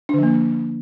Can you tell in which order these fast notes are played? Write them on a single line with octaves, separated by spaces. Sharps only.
D4 D3 F3 A#3